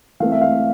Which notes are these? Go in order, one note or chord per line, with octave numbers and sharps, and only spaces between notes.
E3 A3 C4 F5
E5
F5